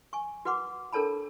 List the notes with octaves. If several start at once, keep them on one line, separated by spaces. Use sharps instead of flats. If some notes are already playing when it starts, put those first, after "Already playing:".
G#5 C#6
F#4 B4 F#5 C6 D6
D4 A4 A#4 C#5 A5 B5